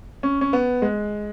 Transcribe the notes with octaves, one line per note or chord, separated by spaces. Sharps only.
C#4
C#4
B3
G#3